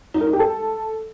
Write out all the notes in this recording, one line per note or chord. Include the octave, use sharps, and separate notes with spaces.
D#4
A#4
D#4
G4
A4